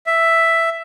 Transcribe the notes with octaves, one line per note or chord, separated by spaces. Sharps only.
E5